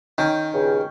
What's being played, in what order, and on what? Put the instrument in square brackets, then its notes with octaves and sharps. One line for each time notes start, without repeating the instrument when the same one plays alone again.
[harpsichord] D#3 [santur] C#4 G5
[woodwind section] G2 A#2 C#3